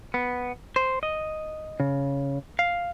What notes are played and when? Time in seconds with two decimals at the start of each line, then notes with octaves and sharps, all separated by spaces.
0.14 B3
0.76 C5
1.03 D#5
1.80 C#3
2.59 F5